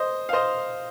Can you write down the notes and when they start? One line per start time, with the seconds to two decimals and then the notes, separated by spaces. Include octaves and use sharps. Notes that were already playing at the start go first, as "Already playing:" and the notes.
Already playing: C5 D#5
0.29 F5
0.33 C5 D#5